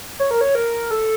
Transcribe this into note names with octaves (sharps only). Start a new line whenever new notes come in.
C#5
A#4
C#5
A#4
A4